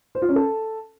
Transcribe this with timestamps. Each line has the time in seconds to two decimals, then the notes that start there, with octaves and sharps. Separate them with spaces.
0.15 C5
0.22 F4
0.29 C#4
0.36 A4